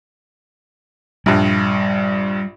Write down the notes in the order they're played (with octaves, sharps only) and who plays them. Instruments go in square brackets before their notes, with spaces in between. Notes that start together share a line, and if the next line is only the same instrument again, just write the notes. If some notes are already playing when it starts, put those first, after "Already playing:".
[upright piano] A#1 G2 [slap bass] G3